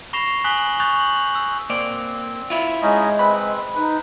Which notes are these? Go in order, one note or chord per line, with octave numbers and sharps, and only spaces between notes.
B5 C#6 A#6 C7 E7 F7
G#5 D#6 F#6 B6 F#7 G7
C#6 D#6 F#6 G6 A6 F7
F#7
E6
A#3 C4 D5
E4 F4
G#3 C#4 D#4 D#5
C4 B4 B5
D#4 B4